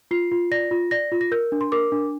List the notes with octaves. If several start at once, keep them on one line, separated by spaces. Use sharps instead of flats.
F4 C7
F4
D5 A#6
F4
D5 A#6
F4
A#6
A#4 G6
D4
C6
A#4 D6
D4